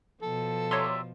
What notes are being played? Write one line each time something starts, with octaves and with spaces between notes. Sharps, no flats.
B2 F3 A4
G4 C#5 D5 E5 A#5 C6